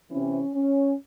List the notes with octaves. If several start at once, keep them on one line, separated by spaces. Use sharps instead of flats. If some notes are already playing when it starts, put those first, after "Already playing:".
C3 E3 C#4
C#4